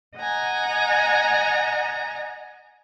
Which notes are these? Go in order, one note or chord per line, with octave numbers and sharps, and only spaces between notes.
D#5 F#5 G#5 A#5